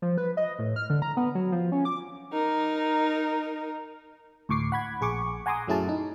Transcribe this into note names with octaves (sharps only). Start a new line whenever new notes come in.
F3
B4
D#5
A2
F6
D3
A#5
B3
F#3
F3
C#4
D6
D#4 A#4
D2 A2 C#6 D6 C7
F#5 B5 G#6
A#1 G#4 C#6 D6
F#5 G#5 A#5 C6 D6 D#6
F#2 F#3 A3 E4 G#4 A5
D#4